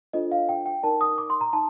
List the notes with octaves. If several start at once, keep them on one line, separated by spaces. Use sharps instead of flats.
D4 F4 A4 C5 D#5
F5
G5
G5
D#4 A#4 D5 A5
D#6
D6
C6
A#5
D#4 A5